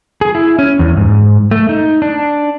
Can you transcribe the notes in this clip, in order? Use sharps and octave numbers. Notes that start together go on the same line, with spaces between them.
G#4
E4
C#4
E2
G#2
A3
D#4
D4